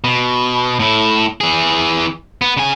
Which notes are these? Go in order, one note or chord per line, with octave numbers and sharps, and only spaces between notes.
B2
A2 E4
E3 G#4
B3
C#3 G#5